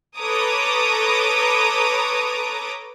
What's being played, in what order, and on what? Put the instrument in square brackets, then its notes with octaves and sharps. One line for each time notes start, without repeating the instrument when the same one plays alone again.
[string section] A4 B4 C#5 A#5 D6 D#6